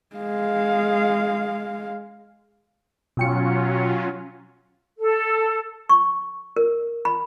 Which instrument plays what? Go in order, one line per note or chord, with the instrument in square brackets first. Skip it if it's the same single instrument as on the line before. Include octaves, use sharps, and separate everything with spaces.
[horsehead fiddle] G#3 F5
[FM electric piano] B2 G5 C#7 [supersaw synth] F#3 C#4 F4
[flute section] A4
[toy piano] C#6
A#4
B5